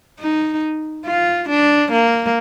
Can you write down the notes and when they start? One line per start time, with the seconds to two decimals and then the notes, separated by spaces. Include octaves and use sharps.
0.20 D#4
1.06 F4
1.49 D4
1.92 A#3